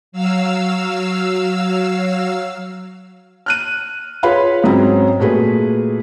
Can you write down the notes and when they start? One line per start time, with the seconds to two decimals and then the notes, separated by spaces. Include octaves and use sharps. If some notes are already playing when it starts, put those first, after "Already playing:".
0.12 F#3 F5 E6
3.46 F6 F#6 D#7
4.23 F4 G#4 B4 C#5 F5 B5
4.64 G#2 F#3 C4 C#4
5.19 A#2 A3 F#4 G#4 B4